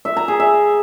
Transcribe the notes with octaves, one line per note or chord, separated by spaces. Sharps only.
E5
A#5
G#4
E5